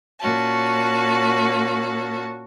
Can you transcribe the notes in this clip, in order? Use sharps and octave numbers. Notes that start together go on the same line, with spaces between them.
A#2 C#4 F#4 A5